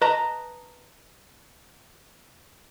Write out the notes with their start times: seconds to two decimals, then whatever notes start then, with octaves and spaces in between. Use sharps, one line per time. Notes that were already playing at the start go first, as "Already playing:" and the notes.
0.02 B4 D#5 A5 A#5